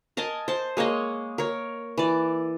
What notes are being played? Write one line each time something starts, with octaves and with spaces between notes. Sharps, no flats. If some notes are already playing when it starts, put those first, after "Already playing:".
A#4 D#5 G#5 A5
C5 A5
G#3 A#3 C#5 D#5
A#4 C#5
E3 D5